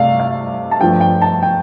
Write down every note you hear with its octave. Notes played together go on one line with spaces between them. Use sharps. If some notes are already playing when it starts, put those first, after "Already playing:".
Already playing: C3 A3 D5 F5
F5
A5
G2 F3 A3 G5
G5
A5
G5